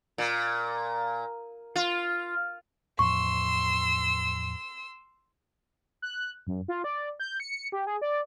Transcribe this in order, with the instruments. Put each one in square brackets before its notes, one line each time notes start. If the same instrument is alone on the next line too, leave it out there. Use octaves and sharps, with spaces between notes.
[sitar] A#2
F4
[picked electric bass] E2 A2 F3 [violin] C6 E6 [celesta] C#6
[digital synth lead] F#6
F#2
F4
D5
G6
C#7
G4
G#4
D5